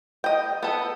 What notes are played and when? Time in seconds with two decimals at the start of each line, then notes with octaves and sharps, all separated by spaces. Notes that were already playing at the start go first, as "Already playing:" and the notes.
0.24 D#5 G5
0.63 B3 A4